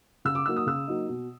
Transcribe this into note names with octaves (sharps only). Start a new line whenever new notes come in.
C#3 E6
D6
F#3 A#3 D#4 E6
D#6
C#3 E6
F#3 A#3 D#4
B2